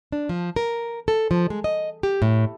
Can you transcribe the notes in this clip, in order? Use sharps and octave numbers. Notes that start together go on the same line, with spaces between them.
D4
F3
A#4
A4
F3
G#3
D#5
G4
A2